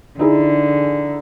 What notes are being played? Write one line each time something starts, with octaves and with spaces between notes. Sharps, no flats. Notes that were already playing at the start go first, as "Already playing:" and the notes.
D3 D#4 E4 G#4